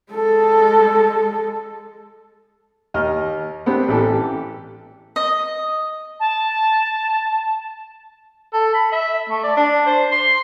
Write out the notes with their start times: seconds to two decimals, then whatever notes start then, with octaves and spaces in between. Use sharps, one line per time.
0.12 G#3 A4
2.94 D#2 D#5 F6
3.66 B3 C4 D4 G4
3.88 A1 E3 G4 A4
5.16 D#5
6.20 A5
8.53 A4
8.74 B5
8.92 E5
9.29 A3
9.43 D5
9.57 D4
9.86 C5
10.12 C6